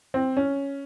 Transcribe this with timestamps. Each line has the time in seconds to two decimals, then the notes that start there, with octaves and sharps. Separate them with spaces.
0.14 C4
0.37 C#4